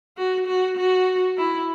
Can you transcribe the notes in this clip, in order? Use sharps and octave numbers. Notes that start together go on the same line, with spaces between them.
F#4
F#4
F#4
E4